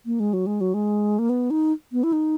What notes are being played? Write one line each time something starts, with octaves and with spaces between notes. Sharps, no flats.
A#3
G#3
F#3
G#3
F#3
G#3
A#3
B3
D#4
B3
E4
D#4